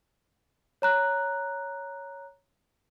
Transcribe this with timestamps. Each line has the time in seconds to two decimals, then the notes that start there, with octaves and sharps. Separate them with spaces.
0.82 C#5 A#5 F#6